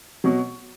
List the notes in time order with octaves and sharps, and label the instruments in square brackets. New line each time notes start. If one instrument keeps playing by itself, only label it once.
[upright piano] B2 F#3